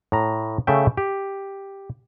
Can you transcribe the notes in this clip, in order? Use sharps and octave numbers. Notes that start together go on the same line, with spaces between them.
A2 A#5
C#3 A3 E5 G5
G4